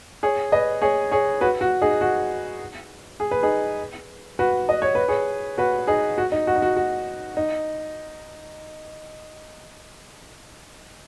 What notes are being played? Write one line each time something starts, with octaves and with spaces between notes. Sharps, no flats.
G#4 C#5
B4 D#5
G#4 C#5
G#4 C#5
F#4 B4
F#4
D#4 G#4
F#4
G#4
B4
D#4 G#4
F#4 B4
D#5
C#5
B4
G#4 C#5
F#4 B4
D#4 G#4
F#4
D#4
F#4
D#4
F#4
F#4
D#4